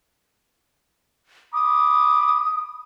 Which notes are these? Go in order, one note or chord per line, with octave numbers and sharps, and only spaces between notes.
B5 D6 D#6